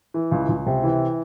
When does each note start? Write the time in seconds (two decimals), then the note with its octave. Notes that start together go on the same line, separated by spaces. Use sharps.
0.14 E3
0.31 C#2
0.49 C#2
0.66 C3
0.83 E3